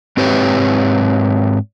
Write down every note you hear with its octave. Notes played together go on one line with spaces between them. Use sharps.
G#2 C4 G4 B4 C#5